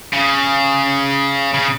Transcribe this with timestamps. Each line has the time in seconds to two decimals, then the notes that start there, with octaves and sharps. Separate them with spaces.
0.13 C#3
1.54 C#3